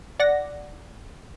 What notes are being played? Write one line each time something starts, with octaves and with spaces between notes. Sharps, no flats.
D5 F#5 A#6